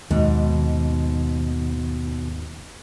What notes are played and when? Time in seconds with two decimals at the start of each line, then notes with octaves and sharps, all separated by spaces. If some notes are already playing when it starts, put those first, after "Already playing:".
0.11 D#2 G#2 B2